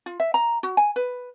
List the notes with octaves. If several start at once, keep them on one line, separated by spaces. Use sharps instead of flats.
F4
E5
A#5
F#4
G#5
B4